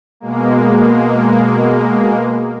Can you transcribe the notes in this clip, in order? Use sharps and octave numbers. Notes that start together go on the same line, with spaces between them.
B2 G#3 A#3